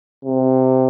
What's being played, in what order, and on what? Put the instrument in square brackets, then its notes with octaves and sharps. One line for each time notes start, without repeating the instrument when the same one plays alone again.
[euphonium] C3